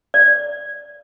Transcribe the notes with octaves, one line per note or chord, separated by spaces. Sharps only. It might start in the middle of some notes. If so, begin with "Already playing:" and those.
D5